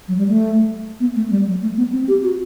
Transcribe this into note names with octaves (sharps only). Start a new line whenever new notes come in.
F#3
G3
A3
B3
A3
G3
F#3
A3
B3
C4
G4
F#4